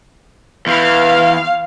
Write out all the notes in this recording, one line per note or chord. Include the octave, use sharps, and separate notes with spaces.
E2 E3 F5